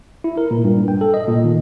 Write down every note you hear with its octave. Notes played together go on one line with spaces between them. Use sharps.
E4
A#4
A#2
G2
G5
A4
D#5
A#2
D#3